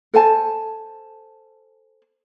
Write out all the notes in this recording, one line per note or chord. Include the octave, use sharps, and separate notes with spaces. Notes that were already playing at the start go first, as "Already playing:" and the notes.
A4 C5 G#5 A5